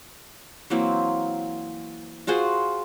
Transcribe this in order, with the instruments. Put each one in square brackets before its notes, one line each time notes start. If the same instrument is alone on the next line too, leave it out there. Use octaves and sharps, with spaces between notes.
[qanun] E3 F#3 A#3 C4
F4 F#4 G#4 C5